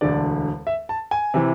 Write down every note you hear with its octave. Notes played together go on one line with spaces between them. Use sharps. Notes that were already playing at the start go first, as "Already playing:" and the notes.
E1 D2 D3 D5
E5
A5
G#5
C3 E3